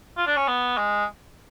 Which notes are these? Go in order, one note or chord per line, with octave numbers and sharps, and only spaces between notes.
F4
D4
C#4
B3
G#3